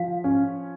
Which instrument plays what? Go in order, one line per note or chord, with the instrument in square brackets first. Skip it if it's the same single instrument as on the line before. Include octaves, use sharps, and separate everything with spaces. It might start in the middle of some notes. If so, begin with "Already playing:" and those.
Already playing: [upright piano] F3 [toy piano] F5
[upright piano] C#4